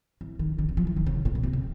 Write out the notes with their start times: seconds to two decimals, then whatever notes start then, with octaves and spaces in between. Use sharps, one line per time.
0.21 E3
0.39 D#3
0.59 D3
0.69 D#3
0.77 F3
0.87 E3
0.97 D#3
1.07 C#3
1.25 A#2
1.35 B2
1.43 C3
1.53 C#3